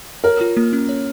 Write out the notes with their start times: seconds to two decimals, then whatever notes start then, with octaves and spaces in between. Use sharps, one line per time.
0.24 A#4 C#5
0.41 F4
0.57 A#3
0.73 C#4
0.89 C#5